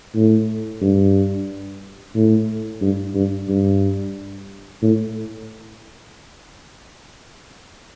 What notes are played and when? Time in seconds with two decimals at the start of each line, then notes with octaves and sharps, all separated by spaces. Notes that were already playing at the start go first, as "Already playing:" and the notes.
0.15 A2
0.81 G2
2.15 A2
2.81 G2
3.14 G2
3.49 G2
4.82 A2